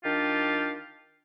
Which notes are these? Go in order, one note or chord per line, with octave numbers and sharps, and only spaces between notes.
D#3 D4 F4 G4